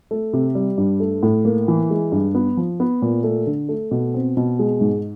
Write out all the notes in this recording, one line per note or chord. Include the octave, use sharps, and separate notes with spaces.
A3
C3
G3
G2
A3
A2
A#3
E3
G#3
G2
B3
F3
B3
A#2
A3
D3
A3
B2
C4
B2
G#3
G#2